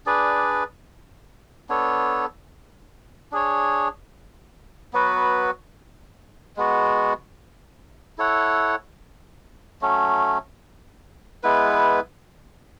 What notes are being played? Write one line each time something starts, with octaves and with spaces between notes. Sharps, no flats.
D4 G#4 B4 D5
B3 D4 A4 C#5
D4 G#4 C#5
F#3 B3 F#4 B4
G#3 B3 F#4
E4 A4 C#5 F#5
F#3 A3 C#4
G#3 B3 E4 B4